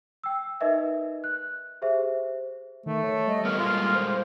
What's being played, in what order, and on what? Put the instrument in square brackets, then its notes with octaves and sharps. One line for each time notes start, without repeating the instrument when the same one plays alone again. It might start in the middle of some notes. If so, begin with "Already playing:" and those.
[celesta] G5 E6
D#4 A#4 B4 D#5 E5
F#6
G4 G#4 C5 E5
[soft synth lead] D#3 [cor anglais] A3
[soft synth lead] C#5
[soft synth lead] G3 [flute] D#5
[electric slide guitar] E3 A#3 B3 [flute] F6
[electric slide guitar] A#2 G#3 A#3 [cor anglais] F4
[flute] C5